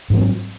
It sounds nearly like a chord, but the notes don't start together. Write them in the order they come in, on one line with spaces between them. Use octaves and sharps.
G#2 F3 C4 F#3